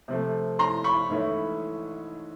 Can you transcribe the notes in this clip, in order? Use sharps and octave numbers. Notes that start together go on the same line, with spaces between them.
C3 F3 A3
A#5 C6
B5 C#6
G#2 E3 A3 C#4 E4